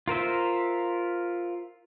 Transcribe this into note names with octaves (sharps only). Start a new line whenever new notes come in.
F4 A#4 C5 E5